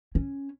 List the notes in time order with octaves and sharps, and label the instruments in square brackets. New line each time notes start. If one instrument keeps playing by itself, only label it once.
[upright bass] C#4